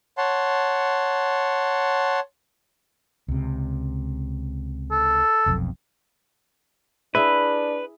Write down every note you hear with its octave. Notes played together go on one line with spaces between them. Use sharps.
C#5 F#5 A5 C6
C#2 C3
A4
F1 B1 F2
D4 E4 G#4 B4 E5